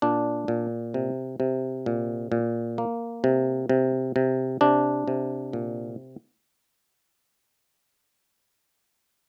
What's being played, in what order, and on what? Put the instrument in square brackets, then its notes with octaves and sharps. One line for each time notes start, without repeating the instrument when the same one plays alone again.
[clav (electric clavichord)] A#2 D4
A#2
C3
C3
A#2
A#2
A#3
C3
C3
C3
C3 D4
C3
A#2